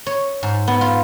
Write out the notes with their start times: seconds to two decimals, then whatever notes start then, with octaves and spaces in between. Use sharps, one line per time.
0.07 C#5
0.43 G#2
0.68 B3
0.81 F4